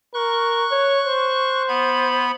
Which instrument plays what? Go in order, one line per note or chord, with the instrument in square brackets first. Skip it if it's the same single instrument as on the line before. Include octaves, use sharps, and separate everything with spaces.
[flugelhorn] A#4 [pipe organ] C#6 F#6
[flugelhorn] C#5
C5
[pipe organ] B3 B5